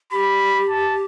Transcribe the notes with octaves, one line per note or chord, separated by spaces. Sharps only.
G4 B5
A5